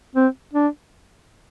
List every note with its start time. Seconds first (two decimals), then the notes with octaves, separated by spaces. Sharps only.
0.16 C4
0.54 D4